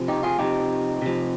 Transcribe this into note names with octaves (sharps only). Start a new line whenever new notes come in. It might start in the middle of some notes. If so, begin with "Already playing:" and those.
Already playing: C3 F3
D#4 G4
F4 G#4
C3 F3 D#4 G4
C3 F3